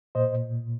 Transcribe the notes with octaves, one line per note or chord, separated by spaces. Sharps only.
A#2 C5 D#5